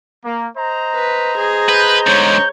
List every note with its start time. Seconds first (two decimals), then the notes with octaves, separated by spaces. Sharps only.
0.25 A#3
0.57 C5 D#5 A#5
0.96 B4
1.38 G#4
1.69 B4 G6
2.07 G#2 D3 C#5